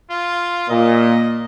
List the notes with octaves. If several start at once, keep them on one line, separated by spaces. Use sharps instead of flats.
F4
A#2 D#5